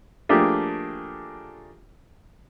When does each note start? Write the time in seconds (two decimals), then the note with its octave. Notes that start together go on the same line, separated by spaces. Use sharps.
0.29 F3 A3 A#3 D4 G4 G#4